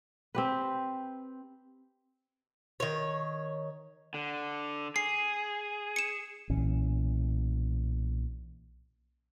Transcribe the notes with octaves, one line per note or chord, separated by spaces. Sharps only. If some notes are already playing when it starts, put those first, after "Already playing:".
C4 G4 B4
D#3 C#5
D3
G#4 C7
C#7 E7
B1 A#2 E3 C#4